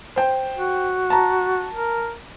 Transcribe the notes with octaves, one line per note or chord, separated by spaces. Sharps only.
C5 G5
F#4
A5 A#5
A#4